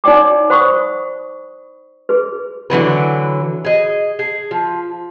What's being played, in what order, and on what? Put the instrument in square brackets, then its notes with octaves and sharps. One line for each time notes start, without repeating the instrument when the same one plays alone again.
[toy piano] D#4 C#5 D5 G5 D6
C5 F#5 B5 C#6 D#6
G#4 B4
[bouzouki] D3 E3 F#3 B4
G#4 D#5
G#4
F3